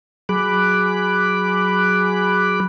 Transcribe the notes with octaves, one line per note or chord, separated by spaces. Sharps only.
F#3 G#4 B5 D6 F#6